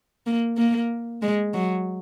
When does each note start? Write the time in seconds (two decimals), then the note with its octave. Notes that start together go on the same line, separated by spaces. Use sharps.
0.26 A#3
0.57 A#3
1.22 G#3
1.54 F#3